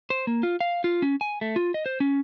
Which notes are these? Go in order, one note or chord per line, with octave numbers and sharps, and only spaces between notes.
C5
A#3
F4
F5
F4
C#4
G#5
A3
F4
D#5
C5
C#4